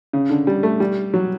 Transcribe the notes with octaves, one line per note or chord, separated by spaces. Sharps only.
C#3
D3
G3
A3
G3
F#3